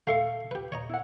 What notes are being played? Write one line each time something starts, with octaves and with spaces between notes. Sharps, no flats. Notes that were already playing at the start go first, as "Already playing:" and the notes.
A3 A4 F5 C6 C#6
G4 B4
C#5 D#5 A#5
E4 F#5